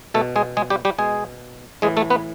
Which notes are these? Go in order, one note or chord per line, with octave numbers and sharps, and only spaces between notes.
B2 A3 A4
G#3 G#4
G#3 G#4
G3 G4
G3 G4
B2 G#3 G#4
A2 E3 G#3 G#4
A3 A4
B3 B4